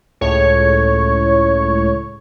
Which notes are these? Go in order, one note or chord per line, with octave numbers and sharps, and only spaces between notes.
C#2 A2 C#5